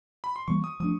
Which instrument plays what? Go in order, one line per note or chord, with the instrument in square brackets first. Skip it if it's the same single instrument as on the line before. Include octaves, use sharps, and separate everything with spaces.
[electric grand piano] B5
C6
[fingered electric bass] E3 G3 A#3 [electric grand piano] C#6
[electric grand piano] D#6
[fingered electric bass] F3 A3 D4 [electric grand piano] D#6